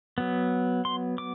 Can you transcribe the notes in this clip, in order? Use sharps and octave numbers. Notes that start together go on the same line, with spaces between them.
F#3 B3
C6
D6